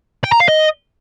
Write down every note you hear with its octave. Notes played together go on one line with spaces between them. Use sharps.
G5
A#5
F5
D#5